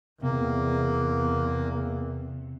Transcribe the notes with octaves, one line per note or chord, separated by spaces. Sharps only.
E2 C3 A#3